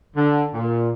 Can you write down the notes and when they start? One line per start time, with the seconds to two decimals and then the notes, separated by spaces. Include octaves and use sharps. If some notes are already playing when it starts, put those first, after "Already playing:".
0.15 D3
0.54 A#2